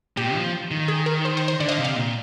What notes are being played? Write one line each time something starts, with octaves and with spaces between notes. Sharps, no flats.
A#2 G4
F3
D#3
G#4
A#4
C5
C5
C5
D3 D5
D#5
F5
C3
F5
A#2